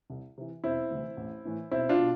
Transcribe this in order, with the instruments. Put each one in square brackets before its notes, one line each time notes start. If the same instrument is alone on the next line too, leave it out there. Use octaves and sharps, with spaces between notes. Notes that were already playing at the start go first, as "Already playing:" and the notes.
[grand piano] C2
C3 E3
E1 C4 E4
D2 C3 E3
A1
A2 E3
B1 C4 E4
D4 F4
B2